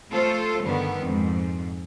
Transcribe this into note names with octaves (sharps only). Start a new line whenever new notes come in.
A3 F4 A4 C5
G2 D3 D#3 B3
F2 G#2